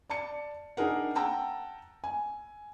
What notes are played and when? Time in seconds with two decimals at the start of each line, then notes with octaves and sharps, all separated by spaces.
0.10 D5 A5 C#7
0.77 D4 D#4 G#4 A#4 F#5
1.15 F#5 G5 A5 A#5 E6
2.04 G#5